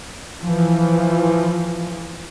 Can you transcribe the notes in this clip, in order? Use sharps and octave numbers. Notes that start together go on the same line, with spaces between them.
E3 F3